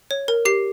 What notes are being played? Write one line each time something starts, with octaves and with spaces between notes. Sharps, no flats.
C#5
A#4
G4 C7